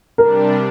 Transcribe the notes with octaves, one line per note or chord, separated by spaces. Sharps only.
C3 G3 D4 A#4